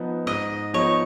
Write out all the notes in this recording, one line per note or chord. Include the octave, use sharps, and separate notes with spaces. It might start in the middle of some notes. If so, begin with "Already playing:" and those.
Already playing: F3 B3 D#4
G#2 D#5
F3 B3 D#4 C#5